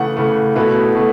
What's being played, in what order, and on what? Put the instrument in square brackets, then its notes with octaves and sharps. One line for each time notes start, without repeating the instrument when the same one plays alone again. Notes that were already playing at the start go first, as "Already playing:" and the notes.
Already playing: [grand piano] C#3 E3 A3 [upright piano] F#5
[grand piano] C#3 E3 A3
B2 A3 E4 B4
B2 A3